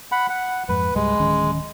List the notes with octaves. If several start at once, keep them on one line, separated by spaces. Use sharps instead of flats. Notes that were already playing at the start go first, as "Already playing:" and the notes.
F#5 B5
F#5
F2 G#2 B4
C#2 G#2 G3 G#3
D1 D#3 C#4